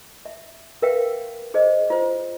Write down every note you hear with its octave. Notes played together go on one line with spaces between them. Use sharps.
E5
A#4 B4 E5 F5 G5
G#4 C5 D#5
F4 C5